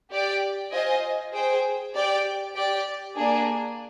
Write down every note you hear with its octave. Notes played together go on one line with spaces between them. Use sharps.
G4 D5 G5
F4 C5 D#5 G#5
G#4 C5 G5
G4 D5 G5
G4 D5 G5
A#3 D4 G#4